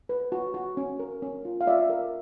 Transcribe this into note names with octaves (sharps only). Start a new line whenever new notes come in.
B4
F#4
F#4
C#4
A#4
C#4
F4
F5
F4 D5 E5
A#4